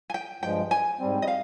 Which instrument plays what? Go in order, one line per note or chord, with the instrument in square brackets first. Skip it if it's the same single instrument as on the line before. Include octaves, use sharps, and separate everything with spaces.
[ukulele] G#5
G5
[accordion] G2 F3 G#3 [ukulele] G5
[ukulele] G#5
[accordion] G#2 G3 C4
[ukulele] D#5
F5